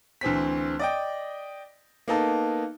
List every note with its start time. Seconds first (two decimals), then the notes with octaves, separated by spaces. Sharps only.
0.21 D2 E3 C4 B6
0.79 D5 D#5 G5
2.08 A#3 B3 D#4 A4